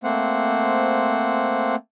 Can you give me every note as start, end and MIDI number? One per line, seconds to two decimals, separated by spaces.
0.04 1.75 57
0.04 1.75 58
0.04 1.75 60
0.04 1.75 72
0.04 1.75 78